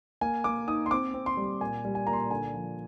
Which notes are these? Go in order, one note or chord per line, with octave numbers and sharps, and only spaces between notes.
A#3 G#5
A#3 D6
D#4 D#6
C6
C4 D6
C4
C6
G3
A#2 G#5
G3
G#5
A#2 A#5
C6
D3 G#5
F3